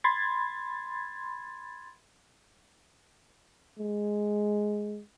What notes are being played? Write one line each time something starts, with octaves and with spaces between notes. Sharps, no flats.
B5 C6 G#6 A6
G#3